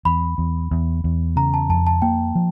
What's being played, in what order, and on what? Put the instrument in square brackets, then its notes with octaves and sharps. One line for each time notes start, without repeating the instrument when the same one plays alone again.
[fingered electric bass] E2 [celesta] B5
[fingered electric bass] E2
E2
E2
[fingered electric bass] C#3 [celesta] A#5
[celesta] A5
[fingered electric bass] F2 [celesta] A5
[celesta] A5
[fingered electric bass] A#3 [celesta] G5
[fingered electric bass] F3